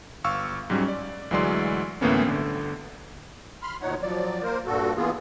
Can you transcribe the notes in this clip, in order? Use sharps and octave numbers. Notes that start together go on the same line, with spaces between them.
G1 F5 C#6 E6
G#2 F#3 G3 C#4
D5
D2 E3 F#3 G#3 D5 C6
D2 A2 E3 A#3 B3 C#4
G1 D3
B5 C6 F6
D2 A#2 D#4 C#5 F#5
F3 F#3 D5
A#3 A#4 C5
G2 A#2 F#4 A4
E3 A#3 B3 F4 G#4